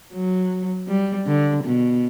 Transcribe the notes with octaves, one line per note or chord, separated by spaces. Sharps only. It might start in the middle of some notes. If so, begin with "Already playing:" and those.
F#3
G3
D3
B2